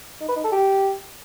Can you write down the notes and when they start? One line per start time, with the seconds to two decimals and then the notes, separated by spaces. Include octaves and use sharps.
0.21 D#4
0.29 B4
0.37 D#4
0.44 A4
0.52 G4